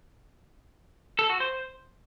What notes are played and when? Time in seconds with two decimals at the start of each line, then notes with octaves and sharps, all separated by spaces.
1.19 A4
1.30 F#4
1.40 C5